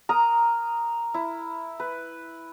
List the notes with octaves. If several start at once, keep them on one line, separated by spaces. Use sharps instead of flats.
A#4 A#5 D#6
E4
B4